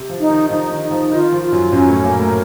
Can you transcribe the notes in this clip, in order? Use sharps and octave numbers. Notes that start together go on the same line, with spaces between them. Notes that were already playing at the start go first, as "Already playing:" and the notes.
Already playing: C3 C4
F3
D#4
D#3
F3 D#4
D#3
D#4
F3
D#3 F4
F3
F4
F#2 F#3
F#2 F#3 C#4
A2 A3
A#2 A#3 A#4
A2 A3